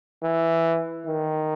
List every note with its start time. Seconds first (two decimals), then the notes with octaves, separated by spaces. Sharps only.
0.23 E3
1.07 D#3